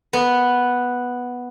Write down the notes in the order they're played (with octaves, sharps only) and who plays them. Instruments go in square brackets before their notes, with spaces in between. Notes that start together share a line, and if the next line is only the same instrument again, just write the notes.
[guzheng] B3